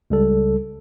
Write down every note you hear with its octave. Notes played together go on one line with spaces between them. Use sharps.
C#2 G3 A4